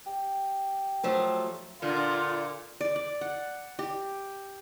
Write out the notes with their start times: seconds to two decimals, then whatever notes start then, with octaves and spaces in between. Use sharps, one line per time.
0.07 G4
1.03 F3 F#3 A3
1.82 A#2 D3 F4
2.81 D5
2.96 D5
3.21 F#5
3.79 G4